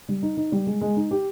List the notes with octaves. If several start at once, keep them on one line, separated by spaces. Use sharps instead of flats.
G3
D#4
D#4
G3
G#3
G#3
D#4
G4